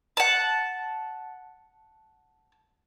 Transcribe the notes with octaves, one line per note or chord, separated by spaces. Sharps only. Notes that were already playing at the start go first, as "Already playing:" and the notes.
F#5 A5